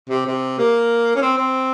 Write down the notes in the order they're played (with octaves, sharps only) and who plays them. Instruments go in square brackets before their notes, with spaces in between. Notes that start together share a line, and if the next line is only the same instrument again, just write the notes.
[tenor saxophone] C3
C3
A#3
C#4
C4
C4